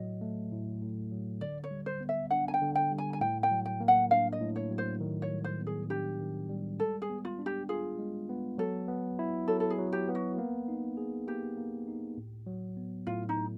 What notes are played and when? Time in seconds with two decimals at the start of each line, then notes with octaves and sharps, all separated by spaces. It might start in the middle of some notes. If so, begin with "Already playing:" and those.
Already playing: A2 F#3 D#5
0.21 A3
0.52 A2
0.82 A2
1.12 F#3
1.41 D3 D5
1.64 C#5
1.71 G3
1.86 C5
2.01 B3
2.09 E5
2.31 D4 F#5
2.48 G#5
2.54 G5
2.61 D3
2.76 G5
2.91 G3
2.98 G#5
3.13 G#5
3.21 A2 G5
3.43 G5
3.51 F#3
3.66 G5
3.81 A#3
3.88 F#5
4.10 D4 F5
4.33 D#5
4.41 A2
4.56 C#5
4.71 F#3
4.78 C5
5.00 D#3
5.22 C#5
5.29 G3
5.44 C5
5.60 B3
5.67 G#4
5.90 D4 G4
6.20 D#3
6.49 G3
6.79 G#3 A4
7.02 G#4
7.09 B3
7.25 F4
7.39 D4
7.46 G4
7.69 F4 G#4
7.99 G#3
8.29 B3
8.58 F#3 A4
8.88 B3
9.19 E4
9.48 F#3 A4
9.60 A4
9.70 G#4
9.79 F#3
9.93 G4
10.08 B3
10.15 F#4
10.38 A#3
10.68 D#4
10.97 G#4
11.27 A#3 G4
11.57 A#3
11.88 D#4
12.17 A2
12.47 F#3
12.77 B3
13.07 A2 F4
13.29 D#4
13.37 A2